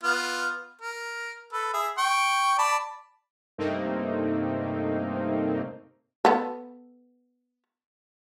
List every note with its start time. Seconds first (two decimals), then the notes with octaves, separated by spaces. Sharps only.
0.04 B3 F4
0.81 A#4
1.53 A4 B4
1.74 G#4 E5
1.98 G5 C#6
2.58 D5 A5 B5
3.58 G2 C3 A3 A#3 C4 D#4
6.25 B3 A4